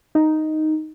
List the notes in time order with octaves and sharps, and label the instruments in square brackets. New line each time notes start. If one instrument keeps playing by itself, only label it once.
[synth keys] D#4